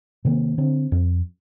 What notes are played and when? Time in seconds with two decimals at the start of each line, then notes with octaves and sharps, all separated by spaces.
0.25 C3 D#3 A#3
0.58 D3 C4
0.92 F2